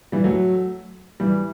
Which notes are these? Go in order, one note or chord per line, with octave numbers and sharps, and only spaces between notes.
E3 G3
F#3 A3
E3 G3